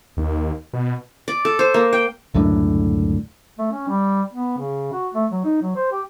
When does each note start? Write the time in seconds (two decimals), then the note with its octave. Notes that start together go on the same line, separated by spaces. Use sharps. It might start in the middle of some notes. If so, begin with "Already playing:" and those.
0.17 D#2
0.73 B2
1.28 D5
1.45 A4
1.59 C5
1.74 A#3
1.93 G5
2.34 C#2 F#2 A2 D3
3.58 A3
3.71 C#4
3.88 G3
4.33 B3
4.58 C#3
4.93 F#4
5.14 A3
5.31 F#3
5.44 D#4
5.62 F#3
5.76 C5
5.92 G4